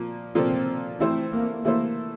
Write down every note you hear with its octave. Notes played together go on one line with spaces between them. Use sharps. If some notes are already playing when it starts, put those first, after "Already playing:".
Already playing: A#2 F3 A#3
A#2 F3 A#3 C4 F4 A4
E3 A3 C4 E4 A4 C5
A#3
E3 A3 A#3 E4 A4 C5